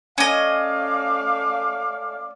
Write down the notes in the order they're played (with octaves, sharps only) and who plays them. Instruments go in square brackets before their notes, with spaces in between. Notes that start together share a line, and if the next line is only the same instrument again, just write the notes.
[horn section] A3 D5 F5 [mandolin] C#4 D#5